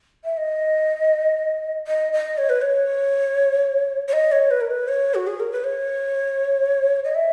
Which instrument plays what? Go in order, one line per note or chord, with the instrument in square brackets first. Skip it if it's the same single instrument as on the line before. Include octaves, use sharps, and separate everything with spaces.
[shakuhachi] E5
D#5
D#5
D#5
C#5
B4
C#5
C#5
D#5
C#5
B4
A#4
B4
C#5
F#4
G#4
A#4
B4
C#5
D#5
E5